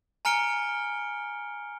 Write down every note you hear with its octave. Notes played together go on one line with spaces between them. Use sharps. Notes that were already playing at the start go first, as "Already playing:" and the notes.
G#5 A#5 F6 C#7 D7 G7